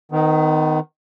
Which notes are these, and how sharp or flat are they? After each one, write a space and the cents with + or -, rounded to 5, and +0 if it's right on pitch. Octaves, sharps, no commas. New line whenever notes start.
D#3 +0 B3 +35